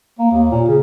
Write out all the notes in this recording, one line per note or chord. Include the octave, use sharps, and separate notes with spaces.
A#3
D#2
A#2
C#3